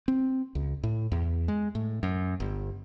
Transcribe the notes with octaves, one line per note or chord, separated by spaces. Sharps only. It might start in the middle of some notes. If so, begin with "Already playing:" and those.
C4
C#2
A2
E2
G#3
A2
F#2
G1